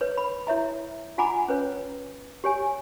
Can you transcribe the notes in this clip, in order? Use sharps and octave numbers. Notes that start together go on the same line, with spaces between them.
B4 C#5
B5
E4 C#5 E5 A#5
F4 F#5 G#5 A#5 B5 D6
C#4 B4 C#5
G4 C#5 G#5